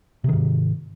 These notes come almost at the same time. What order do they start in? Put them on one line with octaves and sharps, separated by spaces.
C3 D#3 G#2